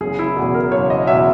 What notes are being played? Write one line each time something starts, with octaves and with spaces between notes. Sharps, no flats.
F#1 G#4
E4
E2 B2 G#4
A#4
F#1 C#5
D#5
E2 B2 E5